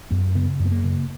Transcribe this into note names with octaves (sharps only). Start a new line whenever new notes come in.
F#2 B3
C#3 B3
F#2
B3
A#3
C#3